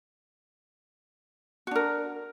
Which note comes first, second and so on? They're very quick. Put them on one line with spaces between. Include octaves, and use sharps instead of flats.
F#4 D4 A#4